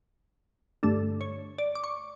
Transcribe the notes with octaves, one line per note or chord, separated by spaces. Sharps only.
G2 D3 A3 D4 A4
C#5
D5
D6
C#6